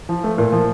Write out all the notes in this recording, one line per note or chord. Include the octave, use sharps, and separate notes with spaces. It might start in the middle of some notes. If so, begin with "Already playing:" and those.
F3
A3
A#2
F3